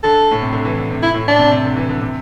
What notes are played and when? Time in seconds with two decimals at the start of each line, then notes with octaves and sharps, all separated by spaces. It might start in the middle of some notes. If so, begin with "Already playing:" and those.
0.03 D3 A4
0.31 A2
0.42 C3
0.53 D3
0.65 E3
0.78 D3
0.91 C3
1.03 E4
1.14 A2
1.27 A2 D4
1.39 C3
1.51 C3
1.65 D3
1.76 E3
1.89 D3
2.02 C3